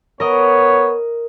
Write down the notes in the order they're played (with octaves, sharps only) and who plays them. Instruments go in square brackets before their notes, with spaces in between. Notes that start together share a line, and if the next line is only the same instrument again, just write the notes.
[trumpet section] B3 C#5 [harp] A#4 D#5